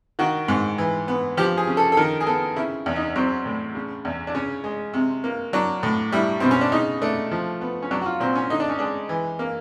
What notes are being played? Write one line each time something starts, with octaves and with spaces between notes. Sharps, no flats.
D#3 F#4
G#2
E3
B3
F3 G4
G#4
C#3
A4
A4
D#3 A#4
G#4
B3 A4
C#3 E4
E2
D#4
F#3 C4
A2
C#3
E2
D4
C#3 C#4
G#3
C3
A#3
F#3 D4
A2
G3 E4
B2 C4
C#4
D4
C#3 D#4
A3 D4
F3
B3
C#4
F#3 D4
F#4
F4
A#2 C4
C#4
D3 D#4
D4
C#4
G#3 D4
E3
A#3